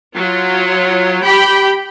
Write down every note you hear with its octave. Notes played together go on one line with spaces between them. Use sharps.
F#3 F4
G4 G5 B5